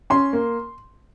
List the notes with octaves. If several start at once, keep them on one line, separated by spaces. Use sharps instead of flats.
C#4 C6
A#3